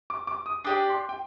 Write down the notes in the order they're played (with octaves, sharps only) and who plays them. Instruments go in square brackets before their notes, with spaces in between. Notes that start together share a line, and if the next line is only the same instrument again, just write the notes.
[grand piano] D6
D6
D#6
[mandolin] D4 G4 D5 [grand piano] D#6
[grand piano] C6
G5